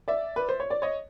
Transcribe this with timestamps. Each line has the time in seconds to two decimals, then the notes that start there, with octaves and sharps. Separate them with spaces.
0.08 D5 E5
0.36 B4
0.49 C5
0.60 C#5
0.70 D5
0.82 C#5 D#5